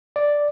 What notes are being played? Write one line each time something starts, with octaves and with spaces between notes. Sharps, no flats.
D5